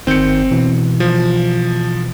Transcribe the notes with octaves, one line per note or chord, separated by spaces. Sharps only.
G1 D#3 C4 G6 C#7
B2 E3
F3